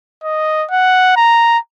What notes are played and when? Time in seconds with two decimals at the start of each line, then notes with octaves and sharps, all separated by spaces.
0.24 D#5
0.71 F#5
1.16 A#5